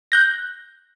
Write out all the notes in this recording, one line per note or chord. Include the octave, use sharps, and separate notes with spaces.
F#6 G6 A#6